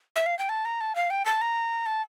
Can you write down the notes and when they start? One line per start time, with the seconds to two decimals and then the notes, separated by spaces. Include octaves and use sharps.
0.16 E5
0.26 F5
0.39 G5
0.49 A5
0.65 A#5
0.81 A5
0.95 F5
1.10 G5
1.26 A5
1.41 A#5
1.86 A5